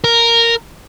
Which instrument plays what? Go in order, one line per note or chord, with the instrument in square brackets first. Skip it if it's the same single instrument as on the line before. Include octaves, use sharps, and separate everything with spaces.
[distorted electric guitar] A#4